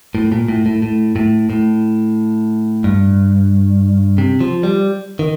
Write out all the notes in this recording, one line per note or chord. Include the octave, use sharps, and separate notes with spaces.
A2
A#2
A2
A2
A2
A2
A2
G2
C3
F3
G3
D#3